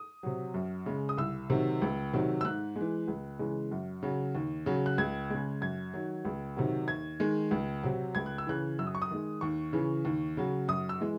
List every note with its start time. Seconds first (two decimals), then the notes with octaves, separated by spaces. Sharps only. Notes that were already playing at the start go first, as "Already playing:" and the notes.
Already playing: D#6
0.23 C3 F#3
0.54 F#2
0.86 C#3 G#3
1.09 D#6
1.17 C2 E6
1.50 C3 D#3 F#3
1.82 C#2
2.13 C3 D#3 F#3
2.41 E6
2.45 G#2 F#6
2.76 E3 G#3
3.08 C#2
3.39 C#3 E3 G#3
3.71 F#2
4.03 C#3 F#3
4.35 D#2
4.66 C#3 F#3
4.86 F#6
4.98 C#2 G#6
5.30 C#3 G#3
5.61 F#2 G#6
5.94 D#3 F#3
6.25 C#2
6.57 C3 D#3 F#3
6.88 D#2 G#6
7.20 D#3 G#3
7.51 C#2
7.83 C3 F#3
8.15 C#2 G#6
8.26 F#6
8.38 E6
8.47 C#3 E3 F#6
8.79 F#2 E6
8.87 D#6
8.95 C#6
9.02 D#6
9.11 D#3 G#3
9.41 D#2 C#6
9.73 C#3 E3
10.05 D#2
10.37 C#3 F#3
10.68 F#2 D#6
10.89 E6
11.01 E3 G#3